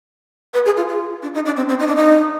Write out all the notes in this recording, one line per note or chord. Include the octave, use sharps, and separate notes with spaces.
B4
G#4
F4
F4
D4
D#4
D4
C4
C4
D#4
D4
D#4